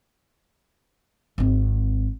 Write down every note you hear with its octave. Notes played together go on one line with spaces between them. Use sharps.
G#1 C4